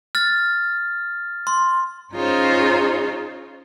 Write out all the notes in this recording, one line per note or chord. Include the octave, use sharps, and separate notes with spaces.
F6 A6
C6
C#4 D#4 F4 G#4 C5 C#5